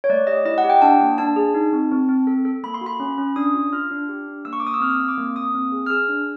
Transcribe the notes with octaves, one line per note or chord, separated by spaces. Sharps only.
C#5
A3 D5
G4 D#5
E4 D#5
F#5
G4
G5
D4 A5
A#3
D4 A5
G#4
D#4
C4
C4
C4
A4
A4
A#3 B5
C6
F#4
B5
C#4
C#4
D4 D#6
F4
F4 F6
D4
G4
D4
A#3 E6
C#6
D6
A#3 D#6
E6
C4 F6
E6
C4 D#6
D6
A#3
A#3 D#6
C4
G#4
F6
G#4 E6
D4